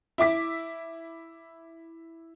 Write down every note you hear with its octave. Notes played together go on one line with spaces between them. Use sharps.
E4 E5 D6 B6